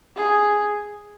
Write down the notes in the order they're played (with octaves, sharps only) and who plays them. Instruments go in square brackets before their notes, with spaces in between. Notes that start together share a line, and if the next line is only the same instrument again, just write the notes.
[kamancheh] G#4